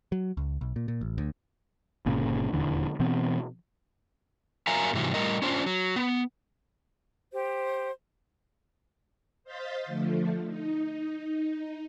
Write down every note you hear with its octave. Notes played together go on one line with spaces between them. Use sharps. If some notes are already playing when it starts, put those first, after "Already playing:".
F#3
C#2
B1
A#2
A#2
A1
D2
G1 A#2 C#3
D#1 E2 D3 E3
B2 E3 B3 C4
F#3 A#4 E5 F5 G#5 A#5
G#2 C3 E3 F#3
A2 G3 C4 A#4 D#5
C#4 D4 F4 C5
F#3
B3
G4 C5
C5 D#5 F5 G6 A6 B6
D3 F3 A3
D#4